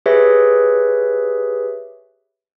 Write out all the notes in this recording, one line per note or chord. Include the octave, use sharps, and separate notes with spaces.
G4 G#4 B4 C#5 E5